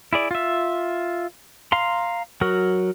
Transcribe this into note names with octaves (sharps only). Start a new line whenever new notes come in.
E4 G#4 D5
F4 E5
F5 A#5 C6
F#3 F#4 A#4